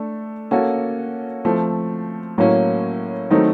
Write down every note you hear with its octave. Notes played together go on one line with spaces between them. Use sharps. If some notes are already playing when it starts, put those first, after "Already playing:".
Already playing: A3 D4 A4
A#3 C#4 F#4 A4
F3 A3 C4
A2 F#3 A#3 C#4
D#3 F#3 A3 C4 D#4